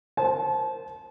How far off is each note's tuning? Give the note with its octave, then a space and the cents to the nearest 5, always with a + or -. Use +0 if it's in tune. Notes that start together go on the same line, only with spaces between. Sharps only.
C5 +0 A5 -25